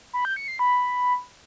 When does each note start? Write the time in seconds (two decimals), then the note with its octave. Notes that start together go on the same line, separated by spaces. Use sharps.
0.13 B5
0.25 G6
0.36 C#7
0.48 C7
0.59 B5